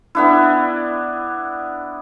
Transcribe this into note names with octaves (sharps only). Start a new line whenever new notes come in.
B3 D4 E4